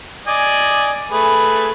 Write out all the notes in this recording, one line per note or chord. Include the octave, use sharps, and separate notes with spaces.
D5 D#5 G#5
A3 G#4 B4